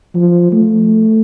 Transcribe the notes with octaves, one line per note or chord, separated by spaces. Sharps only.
F3
A3